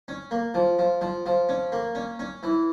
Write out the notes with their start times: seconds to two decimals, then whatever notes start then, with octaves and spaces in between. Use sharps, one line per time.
0.08 C#4
0.31 A#3
0.54 F3
0.79 F3
1.01 F3
1.26 F3
1.49 C#4
1.72 A#3
1.95 C#4
2.19 C#4
2.43 E3